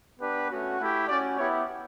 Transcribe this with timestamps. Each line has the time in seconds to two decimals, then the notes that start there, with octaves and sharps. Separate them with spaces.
0.20 B3 D4 G4 B4
0.50 A3 C#4 F#4
0.79 A3 E4 G4
1.08 C#4 F#4 D5
1.38 B3 E4 G4 C#5